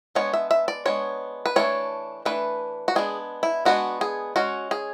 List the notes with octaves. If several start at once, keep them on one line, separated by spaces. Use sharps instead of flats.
G#3 B3 D4 C#5
E5
E5
D5
G#3 B3 D4 C#5
B4
E3 A3 D4 C#5
E3 A3 D4 B4
F#4
G#3 B3 D4 G#4
E4
G#3 B3 D4 F#4
G#4
G#3 C#4 F#4
G#4